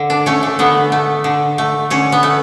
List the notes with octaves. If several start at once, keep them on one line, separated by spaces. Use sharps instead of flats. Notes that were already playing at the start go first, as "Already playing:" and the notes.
Already playing: D3
D4
A3 C#4
A3
D3 B3
A3
D3
A3
D3 C#4
B3
A3